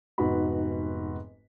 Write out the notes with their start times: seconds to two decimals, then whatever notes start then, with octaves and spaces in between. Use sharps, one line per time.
0.18 F1 G#2 B3 F#4 B5